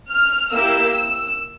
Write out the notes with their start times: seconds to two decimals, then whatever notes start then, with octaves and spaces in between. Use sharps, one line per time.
0.11 F6
0.52 A#3 E4 G4 E6
0.94 E6